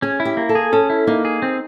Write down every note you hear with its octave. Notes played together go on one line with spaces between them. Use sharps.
C#4 G#4
E4
G4
A#3
A4
G#4
C#4 A4
E4
A#3 D#4
G#4
C4